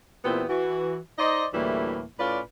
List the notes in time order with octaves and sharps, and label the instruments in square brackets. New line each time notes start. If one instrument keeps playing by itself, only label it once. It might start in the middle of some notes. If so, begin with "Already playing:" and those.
[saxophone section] A#2 E3 B3 C4 E4 G4
E3 F#4
D#4 C5 D5 D#5
D2 A2 E3 G3 A#3 E4
A2 C#4 F4 B4 D5